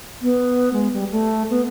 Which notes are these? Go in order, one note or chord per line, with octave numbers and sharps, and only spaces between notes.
B3
G#3
G3
A3
B3